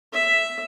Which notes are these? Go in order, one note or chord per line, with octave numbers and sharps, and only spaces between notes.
E5